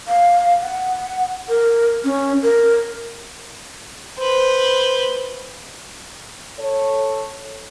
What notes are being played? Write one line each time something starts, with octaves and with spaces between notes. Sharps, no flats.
F5
F#5
A#4
C#4
A#4
B4 C5
A4 C#5